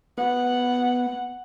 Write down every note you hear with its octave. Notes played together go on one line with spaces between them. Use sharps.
B3 F#5